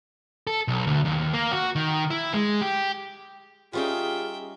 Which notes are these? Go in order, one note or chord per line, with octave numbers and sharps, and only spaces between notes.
A4
B1
D2
D#2
A#3
F#4
D#3
E4
G#3
G4
G3 C#4 D#4 F4 G#4 E5 G5